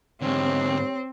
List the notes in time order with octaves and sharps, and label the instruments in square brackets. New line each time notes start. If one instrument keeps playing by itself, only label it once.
[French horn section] D#2 G4 C#5 [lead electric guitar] G#2 D3 [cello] C4